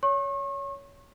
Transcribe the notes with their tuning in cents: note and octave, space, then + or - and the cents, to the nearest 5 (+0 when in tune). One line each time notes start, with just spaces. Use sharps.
C#5 +20 C#6 -40